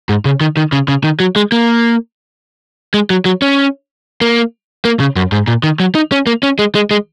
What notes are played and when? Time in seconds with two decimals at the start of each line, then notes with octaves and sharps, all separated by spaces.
0.09 G#2
0.25 C#3
0.41 D#3
0.57 D#3
0.72 C#3
0.88 C#3
1.04 D#3
1.20 F#3
1.36 G#3
1.52 A#3
2.94 G#3
3.10 F#3
3.25 F#3
3.42 C#4
4.21 A#3
4.85 A#3
5.00 C#3
5.16 F#2
5.32 G#2
5.48 A#2
5.63 D#3
5.80 F#3
5.95 D#4
6.12 C#4
6.27 A#3
6.43 C#4
6.59 G#3
6.75 G#3
6.91 G#3